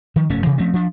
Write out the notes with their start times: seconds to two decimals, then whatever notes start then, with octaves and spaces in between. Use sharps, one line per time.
0.16 D#3 F3
0.30 F1 G2 A3 C#4
0.43 C3 E3
0.58 F3 A3 C4 C#4
0.74 F3 D4